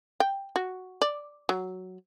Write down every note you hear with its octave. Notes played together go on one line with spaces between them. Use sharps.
G5
F#4
D5
F#3